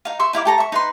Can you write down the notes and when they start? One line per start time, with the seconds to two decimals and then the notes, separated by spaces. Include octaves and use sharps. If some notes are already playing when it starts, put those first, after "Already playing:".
0.05 D#4 F5
0.19 E5 C6 C#6
0.33 D#4 E4 F5 D6
0.45 G4 A4 A#5 C#6
0.58 E5 C#6
0.72 D#4 B4 C6